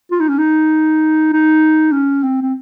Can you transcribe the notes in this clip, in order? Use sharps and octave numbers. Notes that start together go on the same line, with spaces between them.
F4
D#4
C#4
D#4
D#4
C#4
C4
C4